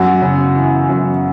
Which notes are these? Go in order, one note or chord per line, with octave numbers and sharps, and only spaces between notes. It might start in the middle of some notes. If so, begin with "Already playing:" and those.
Already playing: F#2 F#4
C#3
E3
F#2